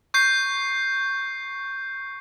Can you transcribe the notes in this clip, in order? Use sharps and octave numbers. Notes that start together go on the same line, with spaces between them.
C#6 G6 C7